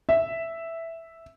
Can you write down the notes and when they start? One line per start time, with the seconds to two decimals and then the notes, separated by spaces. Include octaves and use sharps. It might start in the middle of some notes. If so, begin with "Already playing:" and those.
0.09 E5